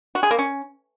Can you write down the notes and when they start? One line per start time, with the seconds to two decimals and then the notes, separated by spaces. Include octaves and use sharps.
0.15 F#4
0.23 G#4
0.31 A#3
0.38 C#4